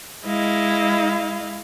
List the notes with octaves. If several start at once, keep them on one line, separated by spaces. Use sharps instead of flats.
G#3 E4 D#5 F5